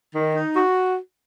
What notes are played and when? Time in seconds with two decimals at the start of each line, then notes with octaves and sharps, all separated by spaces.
0.14 D#3
0.34 D#4
0.54 F#4